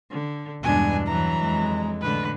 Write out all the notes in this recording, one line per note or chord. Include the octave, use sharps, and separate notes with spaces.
D3
E2 G2 B2 G#3 D4 G#5
E3 F#3 A#5
F2 G#3
A2 D3 B4